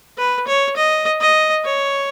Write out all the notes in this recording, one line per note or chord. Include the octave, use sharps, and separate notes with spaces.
B4
C#5
D#5
D#5
C#5